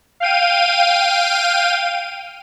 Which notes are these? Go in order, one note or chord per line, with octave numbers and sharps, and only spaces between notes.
F5 G5 D#7